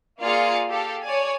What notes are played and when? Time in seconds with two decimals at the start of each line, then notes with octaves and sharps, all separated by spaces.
0.20 A#3 F4 G#4 D5 F5 C#7
0.68 G4 A4 F5
1.04 C#5 D5 G#5